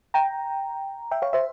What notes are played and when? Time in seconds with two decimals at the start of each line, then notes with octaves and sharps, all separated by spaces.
0.14 G5 A#5
1.11 E5 G5
1.22 C#5 F5
1.33 C5 E5